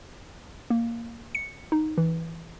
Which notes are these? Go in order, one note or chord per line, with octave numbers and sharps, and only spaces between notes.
A#3
C#7
D#4
E3